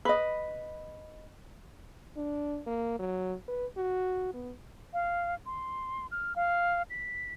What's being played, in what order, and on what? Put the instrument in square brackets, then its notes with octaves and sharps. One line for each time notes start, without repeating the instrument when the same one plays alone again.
[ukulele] B4 D#5
[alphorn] D4
A#3
F#3
B4
F#4
B3
[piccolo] F5
C6
F6
F5
B6